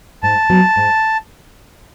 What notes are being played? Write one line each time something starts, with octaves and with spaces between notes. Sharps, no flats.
G#2 A5
F#3 B3
G#2